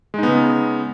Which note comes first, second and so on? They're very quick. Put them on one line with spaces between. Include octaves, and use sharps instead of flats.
G#3 D#4 B3 C#3